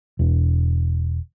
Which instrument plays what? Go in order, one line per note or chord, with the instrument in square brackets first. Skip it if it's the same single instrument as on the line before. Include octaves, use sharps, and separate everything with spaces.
[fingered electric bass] E1